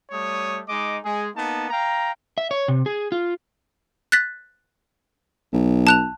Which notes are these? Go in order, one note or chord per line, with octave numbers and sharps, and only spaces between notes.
G3 A3 C#5 D#6
G#3 D#4 D#5 D6
G#3 G#4
A#3 B3 D#4 A5
F5 G5 A#5
E5
C#5
C3
G#4
F4
F#6 A6 B6
B1
A5 F#6 F7